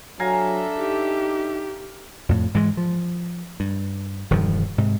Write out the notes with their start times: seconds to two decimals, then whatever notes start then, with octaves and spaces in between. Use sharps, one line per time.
0.20 F#3 D4 A4 E5 F5 G#5 A#5
0.79 D#4 G4
2.29 F2 A2
2.54 G#2 E3 F3 G#3
2.77 F3
3.60 G2
4.31 E1 G2 D#3 F3
4.78 G#2 C3